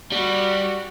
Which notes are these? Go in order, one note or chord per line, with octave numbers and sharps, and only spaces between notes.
G3 F#4